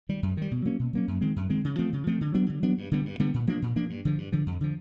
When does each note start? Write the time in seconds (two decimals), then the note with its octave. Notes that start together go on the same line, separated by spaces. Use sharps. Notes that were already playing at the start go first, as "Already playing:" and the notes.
0.09 D#3 G3
0.23 F#2
0.37 D#3 G3
0.51 B2
0.65 F#3 A#3 C#4
0.79 B2
0.93 F#3 A#3 C#4
1.08 F#2
1.21 D#3 G#3 C4
1.36 F#2
1.50 D#3 G#3 C4
1.65 C#3
1.78 F3 A3 C4
1.93 C#3
2.07 F3 A3 C4
2.21 D3
2.34 F#3 B3 D4
2.49 D3
2.63 F#3 B3 D4
2.78 G2
2.91 D3 G3 B3
3.05 G2
3.19 D3 G3 B3
3.34 A#2
3.47 F3 A#3 D4
3.62 A#2
3.76 F3 A#3 D4
3.90 G2
4.05 D3 F3
4.18 G2
4.32 D3 F3
4.46 F2
4.61 D3 F3